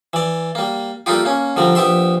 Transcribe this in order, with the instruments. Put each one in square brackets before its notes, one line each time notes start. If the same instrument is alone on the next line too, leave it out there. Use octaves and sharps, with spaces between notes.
[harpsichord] E3 D5
G3 A#3
G3 A3 A#3 D#4 F4 G4
A#3 C#4
D3 F3 G3 A#4
A#1 B3 G4 E5 C6